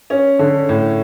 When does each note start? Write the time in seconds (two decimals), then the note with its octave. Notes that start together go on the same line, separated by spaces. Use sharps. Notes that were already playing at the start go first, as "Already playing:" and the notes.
0.10 C#4
0.39 D3
0.69 A2